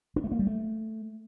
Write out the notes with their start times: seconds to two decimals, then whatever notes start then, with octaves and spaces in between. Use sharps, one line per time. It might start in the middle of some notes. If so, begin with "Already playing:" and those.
0.16 D4
0.24 A3
0.32 A#3
0.39 G3
0.47 A3